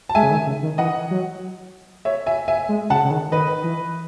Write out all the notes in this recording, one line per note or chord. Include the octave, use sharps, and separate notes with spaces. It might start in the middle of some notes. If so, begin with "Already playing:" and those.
A5
G#3 E5 G#5
C#3
D#3
C#3
D#3
E3 D#5 F#5
F#3
C#5 E5
E5 G#5
E5 G#5
G#3
C#3 F#5 A5
C#3
D#3
D#3 B4 D#5
E3